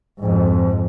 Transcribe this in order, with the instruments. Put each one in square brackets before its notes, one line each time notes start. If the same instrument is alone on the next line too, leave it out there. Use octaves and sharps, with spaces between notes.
[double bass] F2 G#2